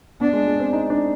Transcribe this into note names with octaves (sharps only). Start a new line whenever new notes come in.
B3 D4
G#3
G#3
C4
D#4
D4